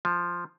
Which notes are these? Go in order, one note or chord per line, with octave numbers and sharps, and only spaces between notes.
F3